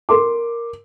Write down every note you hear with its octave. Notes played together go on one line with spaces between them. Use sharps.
A#4 C6 D6